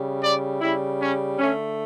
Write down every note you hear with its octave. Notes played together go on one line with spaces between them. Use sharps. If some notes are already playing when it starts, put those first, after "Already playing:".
Already playing: C#3 G3
D5
C#3 G3 E4
C#4
D3 A3 C#4